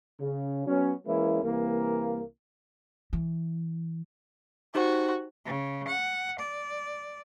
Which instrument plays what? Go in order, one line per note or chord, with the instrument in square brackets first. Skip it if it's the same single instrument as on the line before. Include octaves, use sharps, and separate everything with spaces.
[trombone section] C#3
F#3 B3 C#4
E3 G#3 A#3 C#4 E4
C2 E3 A#3
[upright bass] E3
[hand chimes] D#4 G4 C5 [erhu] F#4
[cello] C#3
F#5
D5